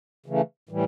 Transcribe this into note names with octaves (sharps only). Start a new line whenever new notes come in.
C#3 E3 A3
A2 E3 G3